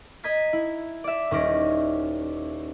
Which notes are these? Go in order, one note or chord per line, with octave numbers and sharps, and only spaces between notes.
D#5 A#5 G#6 B6
E4
D5 E5
D#1 D#3 C#4 D#4 D5 A#6